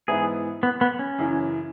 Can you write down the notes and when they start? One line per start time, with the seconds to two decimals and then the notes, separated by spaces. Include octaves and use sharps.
0.08 G#2 E3 B3 E4 G#4
0.63 B3
0.81 B3
0.99 C#4
1.18 F#2 C#3 E3